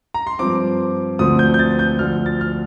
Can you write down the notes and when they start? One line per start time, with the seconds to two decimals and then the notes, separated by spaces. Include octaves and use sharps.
0.14 A#5
0.27 C6
0.39 G2 F3 C4 D6
1.19 D2 D3 F3 A3 C4 D#6
1.39 G6
1.54 G6
1.59 A6
1.79 G6
1.99 D2 D3 F3 F6
2.26 A6
2.41 F6